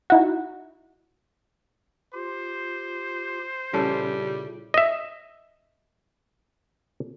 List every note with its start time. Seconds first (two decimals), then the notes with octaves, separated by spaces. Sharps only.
0.10 D#4 E4 F#4
2.14 F4 G4 C5
3.73 A#2 C#3 G3 C#4 E4 A4
4.74 D#5 E5